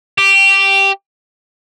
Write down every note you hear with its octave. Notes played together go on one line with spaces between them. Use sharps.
G4